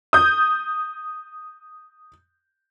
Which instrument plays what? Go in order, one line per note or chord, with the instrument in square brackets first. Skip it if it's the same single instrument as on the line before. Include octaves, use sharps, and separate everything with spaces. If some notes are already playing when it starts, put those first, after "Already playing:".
[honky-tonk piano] D#6 G6